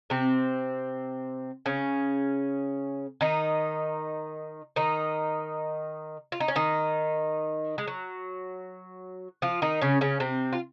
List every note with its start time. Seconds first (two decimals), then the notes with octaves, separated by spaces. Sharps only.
0.10 C3 C4
1.66 C#3 C#4
3.21 D#3 D#4
4.76 D#3 D#4
6.32 F4
6.40 D#4
6.48 C#4
6.56 D#3 D#4
7.78 G#3
7.88 F#3
9.42 F3 F4
9.62 D#3 D#4
9.81 C#3 C#4
10.01 C#3 C#4
10.20 C3 C4
10.53 F4